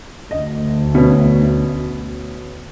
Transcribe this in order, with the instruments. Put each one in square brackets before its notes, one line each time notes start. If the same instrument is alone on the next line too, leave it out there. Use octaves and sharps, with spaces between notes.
[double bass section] D2 [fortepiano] D#5
[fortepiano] B2 C#4